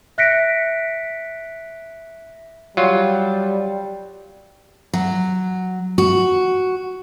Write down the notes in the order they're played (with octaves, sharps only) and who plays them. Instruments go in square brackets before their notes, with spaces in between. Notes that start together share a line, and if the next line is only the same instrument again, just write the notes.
[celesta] E5 F#6 A#6 B6 C#7 D7
[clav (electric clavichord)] F#3 F4 [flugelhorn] G3
[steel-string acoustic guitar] F#3
F#4